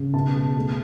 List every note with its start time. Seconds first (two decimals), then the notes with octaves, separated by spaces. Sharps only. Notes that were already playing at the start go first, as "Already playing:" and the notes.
Already playing: C#3
0.14 B2 A5
0.35 G#3
0.56 A3